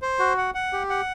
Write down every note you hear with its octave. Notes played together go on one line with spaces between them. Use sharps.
C5
F#4
F#5
F#5
G4
F#5